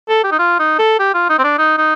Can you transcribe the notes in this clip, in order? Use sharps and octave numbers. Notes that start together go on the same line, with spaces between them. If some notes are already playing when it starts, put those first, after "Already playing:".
A4
G4
D#4
F4
D#4
A4
G4
F4
D#4
C4
D4
D#4
D#4